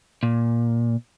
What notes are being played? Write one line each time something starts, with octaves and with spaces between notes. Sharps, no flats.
A#2